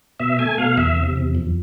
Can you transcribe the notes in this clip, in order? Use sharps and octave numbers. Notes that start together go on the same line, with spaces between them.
B2 E5
A3 G#5
B2 F5
E2 E5
C3
E2
F2